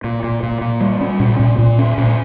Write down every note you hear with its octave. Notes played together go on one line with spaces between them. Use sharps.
A#2
A#2
A#2
A#2
G3
C#4
A#2
A#2
A#2
C#4
A#2